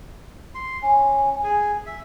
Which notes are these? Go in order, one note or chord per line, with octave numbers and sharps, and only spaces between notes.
C6
C#4
G#4
E5